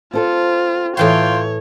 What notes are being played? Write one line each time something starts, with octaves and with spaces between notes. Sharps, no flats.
C4 F4 A4 C5
A2 E3 F4 C#5 G5 C6